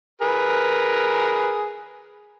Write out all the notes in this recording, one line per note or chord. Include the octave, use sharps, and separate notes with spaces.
G#4 A#4 B4